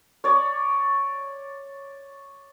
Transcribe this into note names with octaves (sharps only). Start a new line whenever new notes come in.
C#5 D5